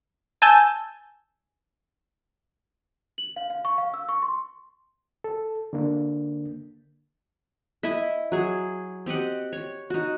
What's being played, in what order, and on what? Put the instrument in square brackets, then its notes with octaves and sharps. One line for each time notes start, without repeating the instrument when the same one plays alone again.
[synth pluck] G#5 A5 E6 G6
[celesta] F#7
F5
F5
C#6
F5
E6
C#6
C6
[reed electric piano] A4
D3 A#3 D4
[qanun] E4 D#5 E5
F#3 G#4
C4 G4 D#5 F#5
C#5
D#4 F#4